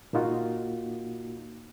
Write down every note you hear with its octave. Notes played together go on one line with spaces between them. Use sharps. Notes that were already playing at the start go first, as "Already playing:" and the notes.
A#2 A#3 D#4 F4 F#4